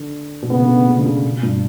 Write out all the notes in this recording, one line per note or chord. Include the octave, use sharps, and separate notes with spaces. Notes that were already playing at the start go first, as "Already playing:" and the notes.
Already playing: D3
B2
C#3 B3
D3
C#3
C#3
D3
C#3
B2
G2